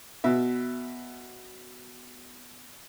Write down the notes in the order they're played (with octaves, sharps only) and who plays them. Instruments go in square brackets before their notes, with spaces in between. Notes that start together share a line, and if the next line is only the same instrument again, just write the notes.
[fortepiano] B2 E5